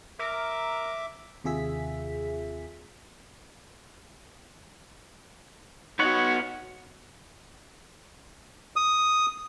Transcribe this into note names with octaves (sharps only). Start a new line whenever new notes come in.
A#4 E5 D6
D#2 C3 F4 G#4 E5 B6
B3 D#4 F#4 C#5 F#5
D#6